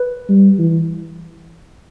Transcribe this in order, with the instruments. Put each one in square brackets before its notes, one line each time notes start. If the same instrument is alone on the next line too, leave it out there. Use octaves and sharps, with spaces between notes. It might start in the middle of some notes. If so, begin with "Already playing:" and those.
Already playing: [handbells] B4
[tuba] G3
E3